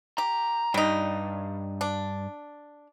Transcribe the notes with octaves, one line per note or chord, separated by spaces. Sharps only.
G4 A#5
G2 G3 D#4
D4